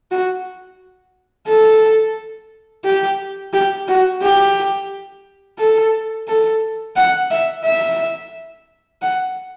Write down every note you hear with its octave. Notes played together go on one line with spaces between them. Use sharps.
F#4
A4
G4
G4
F#4
G4
A4
A4
F#5
E5
E5
F#5